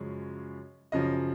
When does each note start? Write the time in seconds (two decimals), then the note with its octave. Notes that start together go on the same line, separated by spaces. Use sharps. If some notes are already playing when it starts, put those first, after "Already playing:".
Already playing: F#2 C#3 F3 G#3 C#4
0.92 F#2 C#3 F3 D#5